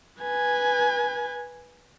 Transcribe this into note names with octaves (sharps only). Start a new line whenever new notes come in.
B4 G#5